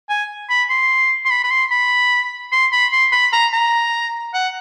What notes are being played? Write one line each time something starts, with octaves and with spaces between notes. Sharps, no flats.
G#5
B5
C6
C6
B5
B5
C6
B5
C6
B5
C6
B5
A#5
A#5
F#5